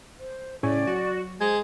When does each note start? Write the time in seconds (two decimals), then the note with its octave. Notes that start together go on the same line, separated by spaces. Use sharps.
0.19 C5
0.63 A2 C#3 C#5 D5 G#5
0.87 F#3 F#4
1.41 G#3 C5 G#6